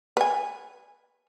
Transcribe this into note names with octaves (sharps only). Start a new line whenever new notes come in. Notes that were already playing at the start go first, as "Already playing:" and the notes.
B4 G#5